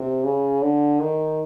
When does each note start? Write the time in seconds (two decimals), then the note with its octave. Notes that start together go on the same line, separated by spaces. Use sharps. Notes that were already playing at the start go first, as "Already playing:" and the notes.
Already playing: C3
0.24 C#3
0.62 D3
1.01 D#3